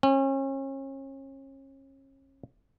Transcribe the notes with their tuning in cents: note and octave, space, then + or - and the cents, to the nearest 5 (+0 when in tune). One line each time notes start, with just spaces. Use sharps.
C#4 -35